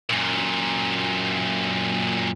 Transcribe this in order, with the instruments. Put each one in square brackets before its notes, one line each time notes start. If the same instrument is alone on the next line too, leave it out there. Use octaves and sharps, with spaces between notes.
[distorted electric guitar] F#2 A#2